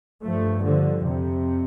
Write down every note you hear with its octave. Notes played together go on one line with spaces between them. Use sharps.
G2 F3 A3
D3 F3
F2 C3